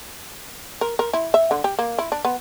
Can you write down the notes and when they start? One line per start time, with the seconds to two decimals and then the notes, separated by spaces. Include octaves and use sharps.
0.81 A#4
0.99 A#4
1.13 E4
1.34 E5
1.51 D3
1.64 G4
1.79 A#3
1.99 E4
2.12 D4
2.25 B3